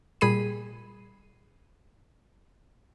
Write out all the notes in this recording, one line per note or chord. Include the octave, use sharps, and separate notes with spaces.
A#2 G3 G#4 B5 C7 D#7